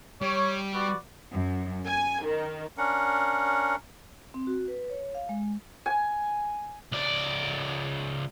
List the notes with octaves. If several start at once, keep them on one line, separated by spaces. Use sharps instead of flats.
G3 C#5
B3 F#4 D5
F#2
G#5
D#3
C#4 D4 A#4 F#5
C4
F#4
B4
C#5
F5
G#3
G#5
C#2 D5